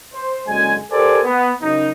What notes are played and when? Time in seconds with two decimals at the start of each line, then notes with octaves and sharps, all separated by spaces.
0.14 C5
0.48 F#1 F#2 D3 G#3 G#5
0.91 G4 A4 A#4 C5 D5 G#5
1.23 B3
1.62 F#2 C#3 D#4